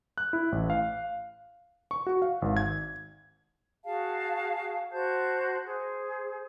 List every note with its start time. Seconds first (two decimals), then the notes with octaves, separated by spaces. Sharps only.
0.18 F#6
0.33 E4
0.52 A1
0.70 F5
1.91 C#6
2.07 F#4
2.22 F5
2.42 G#1
2.57 G#6
3.85 F#4 G#4 F5 A5
4.92 F#4 C5 A5 G6
5.66 G#4 C5